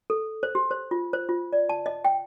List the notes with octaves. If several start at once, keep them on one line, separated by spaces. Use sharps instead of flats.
A4
C5
G4
C5
F4
C5
F4
D5
A5
D#5
G5